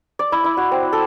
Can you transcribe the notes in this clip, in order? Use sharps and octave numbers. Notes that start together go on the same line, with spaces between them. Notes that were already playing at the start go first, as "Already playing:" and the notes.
D5
E4
E4
F#4
C4
A4